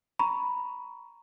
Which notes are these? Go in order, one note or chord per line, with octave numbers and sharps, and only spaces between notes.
A#5 B5 C#6